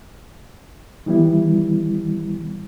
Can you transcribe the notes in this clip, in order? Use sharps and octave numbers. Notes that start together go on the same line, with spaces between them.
D#3 E3 G3 B3 E4